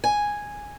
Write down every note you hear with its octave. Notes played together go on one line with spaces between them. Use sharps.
G#5